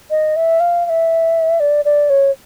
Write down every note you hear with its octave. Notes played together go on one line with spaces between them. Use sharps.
D#5
E5
F5
F5
E5
D5
D5
C#5